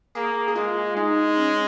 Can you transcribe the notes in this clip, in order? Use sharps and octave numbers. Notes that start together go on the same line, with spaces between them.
A#3 G#4
G#4
G#3 F4
G#3 D#4
D#4
C#4